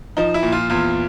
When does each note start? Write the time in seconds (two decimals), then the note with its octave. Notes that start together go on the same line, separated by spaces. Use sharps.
0.17 F3 D#4
0.34 E4
0.43 A#2
0.52 F4
0.70 E2 F4